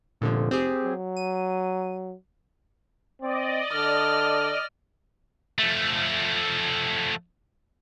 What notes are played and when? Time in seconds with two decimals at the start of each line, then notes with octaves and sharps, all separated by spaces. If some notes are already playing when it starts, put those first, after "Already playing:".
0.22 F1 A#2 D3 F3
0.51 C4 G4 G#4
0.83 F#3
1.17 D#7
3.22 C4 D5 D#5
3.73 D3 F6
5.59 F3 A3